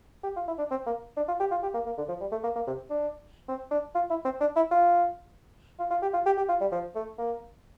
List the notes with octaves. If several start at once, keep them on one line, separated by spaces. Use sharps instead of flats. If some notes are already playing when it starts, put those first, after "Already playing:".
G4
F4
E4
D4
C4
A#3
D4
F4
G4
F4
G4
A#3
A#3
D3
F3
G3
A3
A#3
A#3
C3
D4
C4
D4
F4
E4
C4
D4
E4
F4
F4
F4
G4
F4
G4
G4
F4
G3
F3
A3
A#3